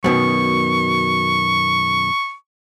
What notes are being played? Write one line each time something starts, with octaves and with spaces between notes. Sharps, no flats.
F#2 B2 D#3 C#6